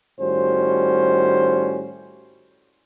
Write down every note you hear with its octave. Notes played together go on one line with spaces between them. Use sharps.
A2 D#3 G3 C#4 F#4 C5